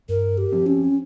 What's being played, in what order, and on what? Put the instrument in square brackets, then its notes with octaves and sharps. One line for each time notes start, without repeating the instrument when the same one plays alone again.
[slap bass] G2 [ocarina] A#4
[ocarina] G4
[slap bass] F3 C4
[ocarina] C#4